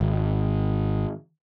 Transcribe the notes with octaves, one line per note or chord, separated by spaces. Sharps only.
G#1